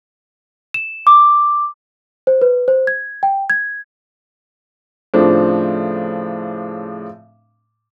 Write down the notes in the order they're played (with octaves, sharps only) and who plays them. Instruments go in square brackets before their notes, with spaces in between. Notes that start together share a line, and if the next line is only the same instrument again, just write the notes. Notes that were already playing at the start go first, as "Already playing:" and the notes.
[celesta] E7
D6
C5
B4
C5
G#6
G5
G#6
[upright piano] A2 C#3 F3 C4 D4